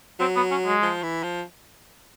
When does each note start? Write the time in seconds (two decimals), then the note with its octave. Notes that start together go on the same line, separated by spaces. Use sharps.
0.20 F#3 C4
0.36 B3
0.51 C#4
0.66 G#3
0.83 F3
1.03 E3
1.23 F3